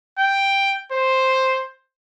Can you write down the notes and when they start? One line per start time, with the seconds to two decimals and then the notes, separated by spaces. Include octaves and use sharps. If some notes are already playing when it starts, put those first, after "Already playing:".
0.19 G5
0.92 C5